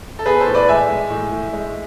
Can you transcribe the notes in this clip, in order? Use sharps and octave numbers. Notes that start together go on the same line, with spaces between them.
A4
B3 G#4 B4
A4 C5
A2
B4 D5
G#3 E5 G#5
G#3
A2
A2
G#3